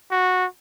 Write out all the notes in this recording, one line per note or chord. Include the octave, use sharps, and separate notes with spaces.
F#4